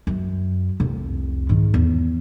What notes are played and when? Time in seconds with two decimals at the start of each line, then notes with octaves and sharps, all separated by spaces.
0.07 F#2
0.80 F1 C2
1.49 G#2 D#3
1.74 E2